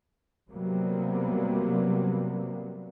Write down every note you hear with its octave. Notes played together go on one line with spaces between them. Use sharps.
C3 F#3 G3 A#3 B3